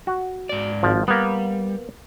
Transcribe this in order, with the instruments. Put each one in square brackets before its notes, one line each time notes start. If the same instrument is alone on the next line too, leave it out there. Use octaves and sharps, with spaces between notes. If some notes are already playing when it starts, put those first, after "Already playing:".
[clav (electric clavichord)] F#4
[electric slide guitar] G#2 D5
[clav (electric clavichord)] G#1 F3
[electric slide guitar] G3 [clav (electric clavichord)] A#3 B3